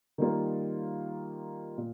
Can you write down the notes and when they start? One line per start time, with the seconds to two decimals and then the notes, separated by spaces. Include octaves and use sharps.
0.18 D#3 G3 A#3 F4
1.78 A#2